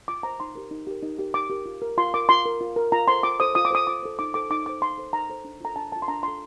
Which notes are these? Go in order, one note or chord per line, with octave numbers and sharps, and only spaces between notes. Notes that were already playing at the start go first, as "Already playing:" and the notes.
F4 D6
C5 A#5
D#4 C6
G4 A#4
D#4
G4 A#4
D#4
G4 A#4
D#4 D6
G4 A#4
F4
A#4
F4 C6
A#4 D6
F4 C6
A#4
F4
A#4
F4 A#5
A4 C5 C6
F4 D6
A4 C5 D#6
F4 D#6
D6
A4 C5 D#6
F4 D6
A4 C5
D#4 D6
A4 C5 D6
D#4 D6
A4 C5 D6
D#4 C6
A4 C5
D#4 A#5
A4 C5
D4
F4 A4 A#5
D4 A5
F4 A4 A5
C6
D4 A#5
F4 A4 C6